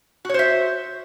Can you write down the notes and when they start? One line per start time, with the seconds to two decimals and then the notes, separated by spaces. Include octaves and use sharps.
0.25 F#4
0.29 C#5
0.34 C5
0.39 E5